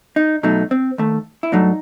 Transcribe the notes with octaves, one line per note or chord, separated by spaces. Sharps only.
D#4
B2 F#3 A3 D#4
C4
D#2 D#3 A3
E4
G2 F#3 A3 D#4